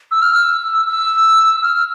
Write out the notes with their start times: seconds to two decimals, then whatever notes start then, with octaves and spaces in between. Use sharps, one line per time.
0.11 E6
0.22 F6
0.33 E6
0.87 E6
1.63 F6